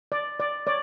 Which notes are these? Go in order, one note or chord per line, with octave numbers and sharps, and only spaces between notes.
D5
D5
C#5 D5